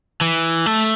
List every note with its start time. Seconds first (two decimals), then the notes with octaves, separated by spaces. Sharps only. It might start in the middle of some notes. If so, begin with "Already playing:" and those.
0.21 E3
0.66 A3